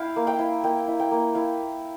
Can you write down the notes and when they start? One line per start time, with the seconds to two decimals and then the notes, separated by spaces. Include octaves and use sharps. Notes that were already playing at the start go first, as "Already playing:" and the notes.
Already playing: E4 F5 G5
0.16 A#3
0.27 G5
0.39 E4
0.63 A#3 G5
0.88 E4
1.00 G5
1.11 A#3
1.35 E4 F5